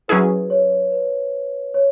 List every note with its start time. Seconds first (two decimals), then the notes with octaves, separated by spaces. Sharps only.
0.08 F#3 C#4 E4 G#4 B4
0.50 C#5
0.92 B4
1.74 C#5